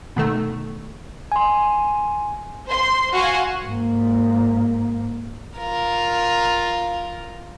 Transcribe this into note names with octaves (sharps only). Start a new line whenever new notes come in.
B2 D#3 A3
G#5 C6
C5 C6
F#4 F5 F#5 G#5 C6
G#2 A#3
F4 A#4